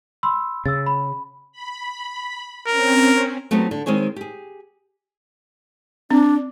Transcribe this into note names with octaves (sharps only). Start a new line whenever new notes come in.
B5 C6 E6
C#3 E6 A6
B5
B5
C4 C#4 A#4
F#3 A3 B3 C4 D#4 G4
D3
D#3 G#3 C4 G#4 C#5
G4 G#4
C4 D4